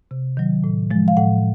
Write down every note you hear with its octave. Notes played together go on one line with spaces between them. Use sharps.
C3
D#3 F#3
A2
F3 G#3
F5
A2 F#5